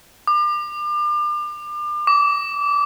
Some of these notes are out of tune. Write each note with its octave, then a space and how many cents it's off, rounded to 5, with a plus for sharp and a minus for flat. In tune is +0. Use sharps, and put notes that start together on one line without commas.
D6 +35
D6 -25